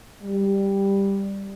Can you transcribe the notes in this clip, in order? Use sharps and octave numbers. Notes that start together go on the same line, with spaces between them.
G3